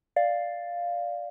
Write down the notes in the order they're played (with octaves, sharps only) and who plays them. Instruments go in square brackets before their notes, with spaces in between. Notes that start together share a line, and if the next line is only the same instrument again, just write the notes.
[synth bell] D5 F5